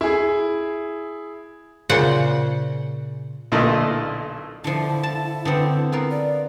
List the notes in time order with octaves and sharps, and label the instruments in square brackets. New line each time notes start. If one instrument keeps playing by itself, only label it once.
[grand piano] E4 G#4
[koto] A#2 C#3 C5 F#5
[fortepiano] B1 A#2 D3 A3 E4 D#5
[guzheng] D3 F3 [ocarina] E4
[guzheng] A5
D3 B3 C4
B3 F4 A#4
[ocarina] D5